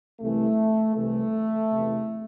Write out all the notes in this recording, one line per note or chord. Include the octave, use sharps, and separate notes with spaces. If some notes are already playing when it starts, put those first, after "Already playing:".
C2 C3 E3 A3
C2 C3 E3 A3
E2 C3 E3